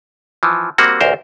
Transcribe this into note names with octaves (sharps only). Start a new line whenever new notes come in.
E3 F3
G3 A#3 C4 F#4
A1 D2 A#4 C5